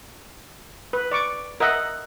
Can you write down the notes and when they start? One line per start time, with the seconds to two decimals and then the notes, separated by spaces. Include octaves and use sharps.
0.93 B4
1.11 D5 C#6 D6
1.60 A#4 D#5 E5 F#5